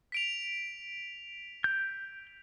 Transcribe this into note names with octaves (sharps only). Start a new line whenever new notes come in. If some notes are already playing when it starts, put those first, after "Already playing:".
B6 D7 F7
G6